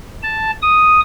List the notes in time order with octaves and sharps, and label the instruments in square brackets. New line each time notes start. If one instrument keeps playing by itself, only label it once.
[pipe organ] A5
D#6